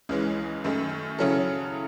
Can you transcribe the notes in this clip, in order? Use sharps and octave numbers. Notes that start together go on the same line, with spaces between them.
C#2 C#3 E3 G#3 C#4
F#2 D#3 A3
C#3 F#3 C#4 E4 A4